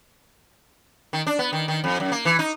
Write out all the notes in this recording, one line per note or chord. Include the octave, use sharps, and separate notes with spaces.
D#3
D4
B3
D#3
D#3
F2
F#2
A#3
E3
D#4